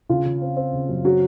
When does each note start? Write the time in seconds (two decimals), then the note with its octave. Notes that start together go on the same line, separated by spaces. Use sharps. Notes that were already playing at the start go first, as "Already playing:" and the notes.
0.09 C#3 F4
0.25 C#3
0.42 C4
0.57 C4
0.73 C#3
0.89 F#2
1.05 F#3